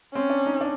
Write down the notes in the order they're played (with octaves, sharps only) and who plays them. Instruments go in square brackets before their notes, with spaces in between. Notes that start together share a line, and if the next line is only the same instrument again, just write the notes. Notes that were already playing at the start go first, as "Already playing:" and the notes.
[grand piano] C4 [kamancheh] C#4
[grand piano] D4
D#4
D4